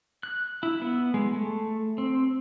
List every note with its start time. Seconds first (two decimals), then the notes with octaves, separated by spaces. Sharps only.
0.23 F#6
0.63 E4
0.82 B3
1.14 G#3
1.34 A3
1.98 C4